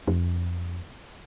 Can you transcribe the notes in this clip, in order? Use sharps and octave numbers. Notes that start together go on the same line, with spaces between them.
F2